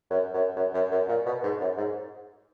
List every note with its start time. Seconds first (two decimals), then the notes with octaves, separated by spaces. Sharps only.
0.10 F#2
0.34 F#2
0.57 F#2
0.74 F#2
0.92 F#2
1.08 A#2
1.26 B2
1.43 G#2
1.61 F#2
1.77 G#2